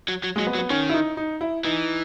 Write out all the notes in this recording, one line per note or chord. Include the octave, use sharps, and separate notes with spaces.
F#3
F#3
G#3
F#3
B3
F#3
B3
D#3 C#4
E4
D#4
D#4
E4
E3 D#4